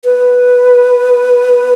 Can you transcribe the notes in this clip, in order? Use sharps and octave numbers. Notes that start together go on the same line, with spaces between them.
B4